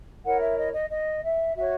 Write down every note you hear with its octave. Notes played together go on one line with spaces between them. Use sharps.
E4 A#4 C#5 F#5
E5
D#5
D#5
D#5
E5
F#4 C#5 E5